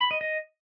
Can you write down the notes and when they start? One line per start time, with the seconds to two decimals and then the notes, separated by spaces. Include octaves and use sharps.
0.01 B5
0.11 D#5
0.21 D#5